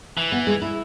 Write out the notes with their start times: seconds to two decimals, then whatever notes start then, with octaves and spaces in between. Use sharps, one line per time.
0.18 E3
0.32 B3
0.47 G#3
0.62 E4